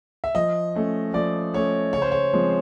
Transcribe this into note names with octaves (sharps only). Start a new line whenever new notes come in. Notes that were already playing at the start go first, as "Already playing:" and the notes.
E5
F3 D#5
A3 C#4
F3 D5
A3 C#4 C#5
C#3 C#5
C5
C#5
F3 G#3 C4